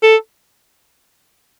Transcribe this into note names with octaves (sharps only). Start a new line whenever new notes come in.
A4